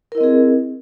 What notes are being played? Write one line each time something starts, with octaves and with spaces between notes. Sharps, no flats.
C4 E4 G#4 A#4 D#5